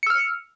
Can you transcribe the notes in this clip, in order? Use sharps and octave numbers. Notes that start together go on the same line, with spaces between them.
E6 F6 C#7